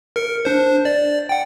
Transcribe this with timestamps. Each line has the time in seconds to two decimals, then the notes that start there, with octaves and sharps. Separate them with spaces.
0.16 A#4 C#7
0.45 D4 C5
0.85 D5
1.29 F#5 G5